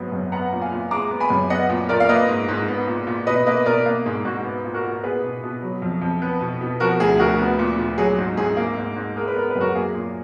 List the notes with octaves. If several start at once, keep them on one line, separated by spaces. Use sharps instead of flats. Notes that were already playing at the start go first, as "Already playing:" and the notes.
Already playing: G#2 F#3 B3
F#2
B3 F#5 A#5
A#2
F5 G#5
A#2
G#3 A#5 D6
B3
G#5 B5
F#2
B3 D#5 F#5
A#2
A#2 A#4 D5
F5
A#3 B4 D#5
G#2
G#2
B3
A#2
A#2
B2 B4 D#5
A#3 B4 D#5
B2 A#4 D5
A#3
G#2 G#4
G#2 F#4
B3
A#2
F#4 A#4
A#2
B3 G#4 B4
B2
B2
F#3
F2
F2
B3
B2
B2
F3 F#4 A#4
D2 G#4
D2 F#4 A#4
B3
A#2
A#2
F#3 G#4
G#2
G#2 G#4
A#3
G#2
G#2
G#3 A#4
B4
B3 A#4
B4
F#2
F#4 A#4
A#3 G#4
A#2